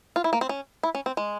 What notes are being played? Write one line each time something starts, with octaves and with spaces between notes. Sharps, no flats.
F4
E4
A#3
C4
C#4
E4
C#4
C4
G#3